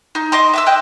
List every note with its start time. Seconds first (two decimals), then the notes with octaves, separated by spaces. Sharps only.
0.15 D#4
0.32 D#5 C6 D6
0.54 E5 D6 E6
0.66 D#5 G5 F#6